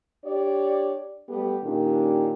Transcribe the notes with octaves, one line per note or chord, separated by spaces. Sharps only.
D4 G4 C#5 D5
G3 A3 B3 G4
A#2 D#3 C#4 D4 G4